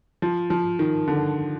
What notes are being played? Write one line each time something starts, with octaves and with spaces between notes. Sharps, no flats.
F3
F3
D#3
D3